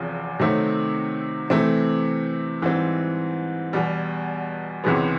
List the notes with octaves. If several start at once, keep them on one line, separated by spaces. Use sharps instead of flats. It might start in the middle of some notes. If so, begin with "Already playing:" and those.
Already playing: F#1 E2 C3 F3
C3 D#3 F#3 A3 C4
C3 E3 A3 C4
G#2 E3 G3 C4
E2 B2 G3
C#2 C3 E3 G#3 B3